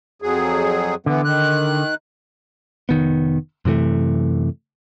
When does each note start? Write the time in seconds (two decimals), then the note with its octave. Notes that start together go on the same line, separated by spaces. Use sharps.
0.22 F2 F#3 G#4
1.06 D3 E3 B3
1.25 D#3 F#6
2.89 F1 D#3 B3
3.65 F#2 C3 E3 A3